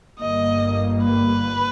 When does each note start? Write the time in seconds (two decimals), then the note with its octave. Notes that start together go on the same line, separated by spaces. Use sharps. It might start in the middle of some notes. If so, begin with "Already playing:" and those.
0.20 G1 G2 G3 A#3 D#5
1.04 B4